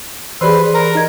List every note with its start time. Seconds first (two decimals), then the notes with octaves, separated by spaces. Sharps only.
0.41 E3 G4 G#4 B4 C5 D5 B5 C6
0.74 A#4 A#5
0.95 D#4 D#5 G#6